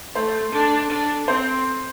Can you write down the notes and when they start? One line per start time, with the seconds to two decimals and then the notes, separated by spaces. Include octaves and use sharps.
0.14 A3 C5
0.52 D4 A4
0.90 D4
1.28 C4 C5